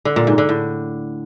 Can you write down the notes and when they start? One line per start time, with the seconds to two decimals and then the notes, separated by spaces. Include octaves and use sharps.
0.05 D3
0.16 A#2
0.27 G#2
0.38 D3
0.49 A2